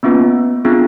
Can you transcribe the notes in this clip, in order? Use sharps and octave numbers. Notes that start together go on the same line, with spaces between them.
A#3 B3 C#4 F4 B4
B3 C4 D4 F4 G#4